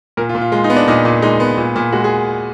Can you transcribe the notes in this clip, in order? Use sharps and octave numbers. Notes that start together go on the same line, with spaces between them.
A#2 A#4
F4
A#2
F4
G#3 F4
D#4
B3
D4
A#2 D#4
A#2
G#3 D#4
B3
A#2
A#2
G#3 F#4
G#4